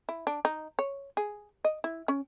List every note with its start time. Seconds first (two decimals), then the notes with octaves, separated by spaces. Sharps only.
0.09 E4
0.27 D4
0.45 D#4
0.79 C#5
1.17 G#4
1.64 D#5
1.84 E4
2.08 C#4